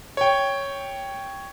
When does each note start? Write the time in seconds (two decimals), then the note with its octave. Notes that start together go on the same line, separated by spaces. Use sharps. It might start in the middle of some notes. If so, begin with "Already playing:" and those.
0.17 C#5 G5